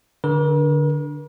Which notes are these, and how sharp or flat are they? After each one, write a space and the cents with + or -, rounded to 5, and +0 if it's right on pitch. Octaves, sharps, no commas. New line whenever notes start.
D3 +0 A#4 +45